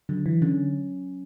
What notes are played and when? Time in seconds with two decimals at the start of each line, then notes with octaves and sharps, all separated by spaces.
0.09 D3 F#3
0.26 E3
0.42 D3 C#4